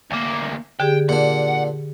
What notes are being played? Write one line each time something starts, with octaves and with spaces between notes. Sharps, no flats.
D2 A#3
D3 G4 G#4 G5
A#2 D4 F#5